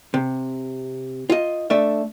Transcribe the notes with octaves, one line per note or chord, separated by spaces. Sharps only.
C3
F4 D#5
A3 D4 A4 E5